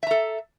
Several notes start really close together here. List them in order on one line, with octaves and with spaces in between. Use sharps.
E5 A#5 A4